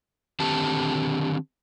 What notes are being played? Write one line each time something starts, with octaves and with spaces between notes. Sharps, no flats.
D3 D#3 C4 G4 A5